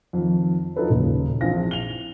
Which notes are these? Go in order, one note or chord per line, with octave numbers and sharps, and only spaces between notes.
F2 D#3
F3 D#4 F#4 A4 B4 C#5
D#1 C#3 A#3
A#1 E3 C4 F5 A#6
F7 G7